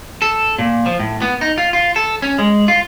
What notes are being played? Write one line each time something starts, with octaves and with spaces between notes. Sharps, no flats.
A4
A#2
F3
A2
B3
D#4
F4
F4
A4
C#4
G#3
F4